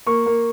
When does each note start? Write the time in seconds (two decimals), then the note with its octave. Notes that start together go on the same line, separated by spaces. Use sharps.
0.07 A#3 C#6
0.26 A#3